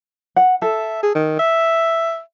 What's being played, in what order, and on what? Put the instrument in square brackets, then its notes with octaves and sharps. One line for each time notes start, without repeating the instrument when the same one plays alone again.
[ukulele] F#5
[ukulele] A4 [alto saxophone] E5
[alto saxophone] G#4
D#3
E5